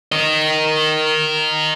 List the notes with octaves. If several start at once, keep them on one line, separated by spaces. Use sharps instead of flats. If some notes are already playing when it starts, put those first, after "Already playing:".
A#4 D#5